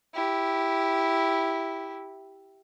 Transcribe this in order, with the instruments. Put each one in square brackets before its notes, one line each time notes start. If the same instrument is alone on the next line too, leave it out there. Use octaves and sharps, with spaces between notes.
[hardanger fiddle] E4 G4